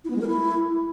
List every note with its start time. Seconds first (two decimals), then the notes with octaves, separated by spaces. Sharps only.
0.05 E4
0.10 B3
0.16 G#3
0.21 A#4
0.27 E4